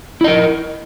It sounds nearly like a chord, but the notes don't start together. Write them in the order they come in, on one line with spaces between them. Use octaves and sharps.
E4 D#5 A#4